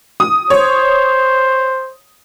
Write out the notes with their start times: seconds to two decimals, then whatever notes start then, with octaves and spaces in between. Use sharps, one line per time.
0.20 D#6
0.50 C5 C#5